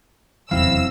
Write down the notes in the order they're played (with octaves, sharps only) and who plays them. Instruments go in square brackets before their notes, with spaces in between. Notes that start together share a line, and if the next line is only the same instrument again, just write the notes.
[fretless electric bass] F1 E2 F#3 [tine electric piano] C4 E4 F5 [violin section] E6